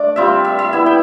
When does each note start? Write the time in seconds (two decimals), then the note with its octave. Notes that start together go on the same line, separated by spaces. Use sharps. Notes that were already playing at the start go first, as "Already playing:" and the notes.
Already playing: A3 D4 D5
0.16 G3 C4 F4 E5
0.45 E5
0.59 E5
0.73 B3 E4 E5
0.86 G5